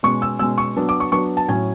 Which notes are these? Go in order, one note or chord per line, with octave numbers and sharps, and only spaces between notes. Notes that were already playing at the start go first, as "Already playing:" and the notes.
B2 G#3 C#4 C#6
E6
B2 G#3 C#4 E6
C#6
F#3 B3 D4
D6
C#6
F#3 B3 D4 C#6
A5
A2 F#3 C#4 G#5